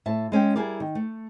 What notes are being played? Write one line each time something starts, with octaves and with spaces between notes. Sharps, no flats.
A2 E5 A5
G#3 C#4 G#4 G5
G3 E4 G#4 A#4 D5
D#3
A3